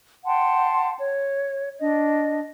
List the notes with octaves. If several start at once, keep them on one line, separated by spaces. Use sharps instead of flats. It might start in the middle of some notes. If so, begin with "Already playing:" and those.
F#5 G5 A5 C6
C#5
D4 D#5